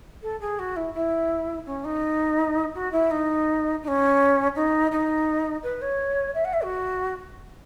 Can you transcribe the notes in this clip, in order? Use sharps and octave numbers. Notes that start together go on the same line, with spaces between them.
A4
G#4
F#4
E4
E4
C#4
D#4
F#4
E4
D#4
D#4
C#4
D#4
D#4
B4
C#5
E5
F#5
E5
F#4